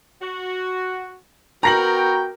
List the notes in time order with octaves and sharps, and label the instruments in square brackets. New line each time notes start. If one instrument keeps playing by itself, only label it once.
[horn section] F#4
[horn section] B3 G5 [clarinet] F#4 [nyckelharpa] A#4 [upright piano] A#5 A#6 F#7